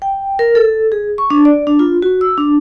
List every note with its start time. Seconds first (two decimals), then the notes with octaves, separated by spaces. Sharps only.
0.02 G5
0.39 A#4
0.55 A4
0.92 G#4
1.18 C#6
1.30 D4
1.45 D5
1.67 D4
1.79 F4
2.02 F#4
2.21 E6
2.38 D4